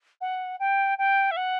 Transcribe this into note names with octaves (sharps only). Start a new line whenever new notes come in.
F#5
G5
G5
E5
F#5